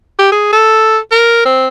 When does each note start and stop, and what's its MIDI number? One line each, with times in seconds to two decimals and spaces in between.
0.19 0.29 67
0.32 0.50 68
0.53 0.98 69
1.12 1.45 70
1.45 1.68 60